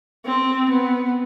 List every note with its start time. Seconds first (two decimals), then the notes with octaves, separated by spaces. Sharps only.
0.25 C4
0.70 B3